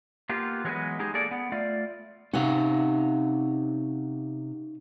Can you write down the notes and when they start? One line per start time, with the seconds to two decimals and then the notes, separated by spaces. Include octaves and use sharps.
0.29 A#3 B3 F4 G4
0.64 E3 F#3 G#3 B3 B4 D#5
0.99 G#3 D#4 G4 G#4
1.14 A#3 G#4 A4 D5
1.31 B3
1.52 A3 F4 D5 F5
2.33 C3 C#4 D#4 F5 F#5